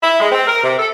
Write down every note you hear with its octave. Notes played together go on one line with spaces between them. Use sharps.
E4
G#3
C4
A#4
C3
A4